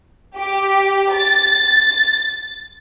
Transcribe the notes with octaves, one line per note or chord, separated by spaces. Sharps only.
G4
A6